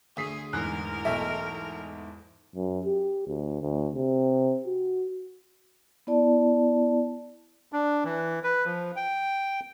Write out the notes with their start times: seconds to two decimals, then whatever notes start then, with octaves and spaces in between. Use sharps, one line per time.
0.17 D2 G#4 D#6 B6 C7
0.53 E2 G#2 A#4 F#6
1.05 B1 A3 E5
2.56 F#2
2.85 G4
3.27 D2
3.62 D2
3.95 C3
4.67 F#4
6.07 B3 E4 D5 A5
7.73 D4
8.05 E3
8.43 B4
8.65 F3
8.96 G5